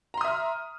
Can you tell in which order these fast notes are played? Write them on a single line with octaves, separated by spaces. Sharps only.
A#5 C6 D#6 E5 F6